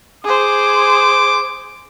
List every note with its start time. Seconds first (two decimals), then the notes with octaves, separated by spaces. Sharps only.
0.24 G#4 C5 D6